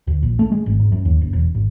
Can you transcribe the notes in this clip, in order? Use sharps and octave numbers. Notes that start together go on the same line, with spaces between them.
D2
A#1
A3
G#3
G#1
G#2
F#2
D#2
F#1
E1
G#1